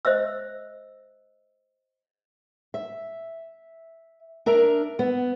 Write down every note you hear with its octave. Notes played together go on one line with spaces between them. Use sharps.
C5 D#5 E5 E6
E5
D4 A#4 E5 A#5
B3